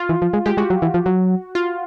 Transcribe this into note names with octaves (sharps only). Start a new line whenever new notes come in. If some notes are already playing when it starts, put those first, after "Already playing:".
Already playing: F4
E3
F3
G#3
G#3 G4
G#3 F#4
F#3
E3
F3
F#3
F4